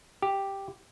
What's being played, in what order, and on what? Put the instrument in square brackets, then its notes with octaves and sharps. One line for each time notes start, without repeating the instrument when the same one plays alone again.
[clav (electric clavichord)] G4